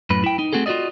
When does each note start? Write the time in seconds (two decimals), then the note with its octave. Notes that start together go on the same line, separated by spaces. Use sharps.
0.10 F#2 A2 B4
0.24 E4 G5
0.39 D#4
0.53 A3 C4 F#4 G#4 A4
0.66 F4 F#4 G#4 D5 D#5